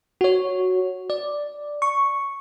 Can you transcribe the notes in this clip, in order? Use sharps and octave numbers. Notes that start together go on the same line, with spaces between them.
F#4 C#5
D5
C#6